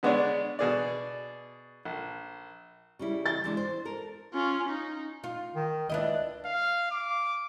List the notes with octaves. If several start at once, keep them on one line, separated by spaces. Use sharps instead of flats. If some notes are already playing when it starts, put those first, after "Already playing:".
D3 G#3 B3 D4 C#5 D5
B2 G#4 D5
A#1
C#3 G3 E4
A6
E3 G#3 D4
C5
A4 A#4
C#4 F4
D#4
F4
D#3
C#2 D4 E4 D#5
F5
D6